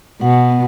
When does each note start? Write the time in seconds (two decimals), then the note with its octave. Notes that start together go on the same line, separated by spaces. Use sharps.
0.21 B2 F#5
0.50 B3